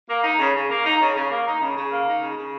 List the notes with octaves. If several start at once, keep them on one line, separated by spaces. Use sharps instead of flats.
A#3
D#4
C#3
C#3
A#3
D#4
C#3
C#3
A#3
D#4
C#3
C#3
A#3
D#4
C#3
C#3